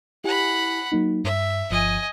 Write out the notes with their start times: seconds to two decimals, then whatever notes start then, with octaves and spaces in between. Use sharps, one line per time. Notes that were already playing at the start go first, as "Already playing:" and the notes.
0.24 E4 G4 F#5 G#5 B5
0.92 F#3 A#3 D#4
1.24 G2 E5
1.71 G1 F3 D#5 G#5